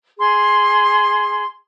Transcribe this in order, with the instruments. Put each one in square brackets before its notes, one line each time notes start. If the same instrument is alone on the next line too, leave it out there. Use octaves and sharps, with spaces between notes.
[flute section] G#4 C6